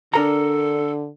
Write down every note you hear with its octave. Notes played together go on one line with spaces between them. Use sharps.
D3 D4 A4 A#4 A#5